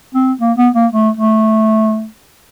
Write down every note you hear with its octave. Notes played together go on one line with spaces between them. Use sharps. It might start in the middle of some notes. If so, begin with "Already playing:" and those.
C4
A#3
B3
A#3
A3
A3